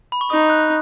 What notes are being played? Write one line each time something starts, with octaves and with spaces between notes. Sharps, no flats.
B5
C#6
D#4 D#6
F#6